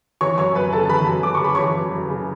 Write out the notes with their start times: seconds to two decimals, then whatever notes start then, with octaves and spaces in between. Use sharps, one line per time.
0.21 E3 C#5 C#6
0.38 F#2 C#5 C#6
0.55 F#2 B4 B5
0.73 C#3 A4 A5
0.86 A5
0.90 E3 B4 B5
1.06 F#2
1.23 F#2 D6
1.35 C#6
1.41 C#3 B5
1.55 E3 C#5 C#6
1.75 F#2
1.92 F#2
2.09 C#3